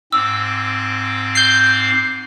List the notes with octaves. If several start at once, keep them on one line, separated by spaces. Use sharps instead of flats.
G#2 C4 D6 E6
G6 C7